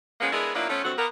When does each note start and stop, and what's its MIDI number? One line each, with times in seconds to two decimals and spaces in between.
0.20 0.31 53
0.20 0.31 56
0.20 0.31 58
0.20 0.31 59
0.20 0.31 61
0.32 0.52 56
0.32 0.52 59
0.32 0.52 62
0.32 0.52 64
0.32 0.52 68
0.32 0.52 70
0.54 0.66 54
0.54 0.66 58
0.54 0.66 59
0.54 0.66 62
0.54 0.66 64
0.54 0.66 65
0.68 0.81 53
0.68 0.81 57
0.68 0.81 59
0.68 0.81 61
0.84 0.92 43
0.84 0.92 50
0.84 0.92 54
0.84 0.92 57
0.84 0.92 60
0.84 0.92 66
0.97 1.05 58
0.97 1.05 59
0.97 1.05 70